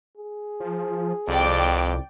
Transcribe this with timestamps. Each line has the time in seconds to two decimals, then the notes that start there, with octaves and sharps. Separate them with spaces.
0.18 G#4
0.60 F3
1.28 C2 F2 D5 G5 D6